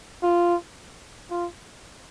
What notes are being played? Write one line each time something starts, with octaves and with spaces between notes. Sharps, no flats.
F4
F4